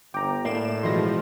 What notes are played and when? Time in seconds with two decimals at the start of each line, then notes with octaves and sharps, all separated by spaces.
0.14 G1 G5 A#5 D6
0.45 A2 A#3 D5 C7 D7 E7
0.83 B2 E3 F3 G#3 C6 A#6